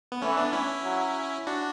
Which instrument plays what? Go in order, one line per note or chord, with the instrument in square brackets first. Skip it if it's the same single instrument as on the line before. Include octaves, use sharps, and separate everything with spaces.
[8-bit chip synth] B3
[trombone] E3 [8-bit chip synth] A3 C#4
[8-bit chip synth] B3 D4
C#4 E4
[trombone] F#3
[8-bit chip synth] D4 F#4